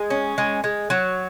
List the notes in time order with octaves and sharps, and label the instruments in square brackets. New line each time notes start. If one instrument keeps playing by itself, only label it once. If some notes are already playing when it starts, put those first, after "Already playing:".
Already playing: [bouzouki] G#3
C#4
G#3
G#3
F#3